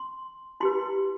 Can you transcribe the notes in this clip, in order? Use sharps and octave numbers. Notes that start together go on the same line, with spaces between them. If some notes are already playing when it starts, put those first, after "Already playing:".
Already playing: C6
E4 G4 B4 C6